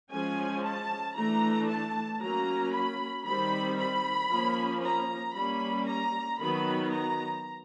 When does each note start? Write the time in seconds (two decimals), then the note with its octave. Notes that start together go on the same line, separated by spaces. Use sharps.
0.11 F3 G#3 C#4 G#5
0.63 A5
1.16 E3 A3 D4 A#5
1.69 A5
2.21 F#3 A#3 C#4 A#5
2.73 B5
3.25 D#3 G3 C4 B5
3.78 B5
4.30 F3 A#3 C#4
4.83 A#5
5.35 G3 A#3 C#4 B5
5.87 A#5
6.39 D#3 F#3 B3 B5
6.92 A#5